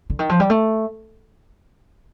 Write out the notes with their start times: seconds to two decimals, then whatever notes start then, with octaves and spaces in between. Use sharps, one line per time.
0.10 D3
0.19 D#3
0.29 F3
0.40 G3
0.50 A3